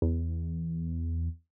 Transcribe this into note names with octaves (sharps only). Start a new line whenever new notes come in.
E2